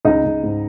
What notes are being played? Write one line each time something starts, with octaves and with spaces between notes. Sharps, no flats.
C#2 D#4 D#5
C#2
G#2